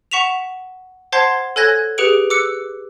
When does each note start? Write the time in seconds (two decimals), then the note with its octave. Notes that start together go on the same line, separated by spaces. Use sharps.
0.11 F#5 C#6 B6 E7 F7
1.12 C5 F#5 A5 C6 G#6 C7
1.56 A4 C#5 G#5 F#6 G#6 A#6
1.98 G4 G#4 B4 C#7 D7 F#7
2.30 D6 E6 F#6 C#7